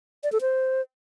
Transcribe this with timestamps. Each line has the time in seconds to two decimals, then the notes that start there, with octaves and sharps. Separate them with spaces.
0.24 D5
0.32 A4
0.41 C5